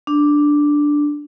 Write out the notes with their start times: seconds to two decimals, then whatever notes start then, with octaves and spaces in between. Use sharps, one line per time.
0.07 D4